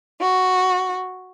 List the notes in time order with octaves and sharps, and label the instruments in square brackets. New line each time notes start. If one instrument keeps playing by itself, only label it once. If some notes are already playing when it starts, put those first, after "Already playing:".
[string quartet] F#4